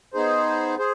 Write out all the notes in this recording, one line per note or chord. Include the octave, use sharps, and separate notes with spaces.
B3 D#4 G#4 C5
G#4 C5